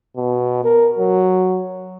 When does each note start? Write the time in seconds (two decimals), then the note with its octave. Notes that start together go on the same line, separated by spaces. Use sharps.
0.17 B2
0.64 A#4
0.98 F#3